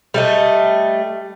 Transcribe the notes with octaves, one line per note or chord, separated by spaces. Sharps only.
G3 A3 D#5